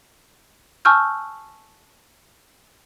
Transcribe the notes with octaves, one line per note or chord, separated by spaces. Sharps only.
G#5 A5 C#6 E6 F6 G6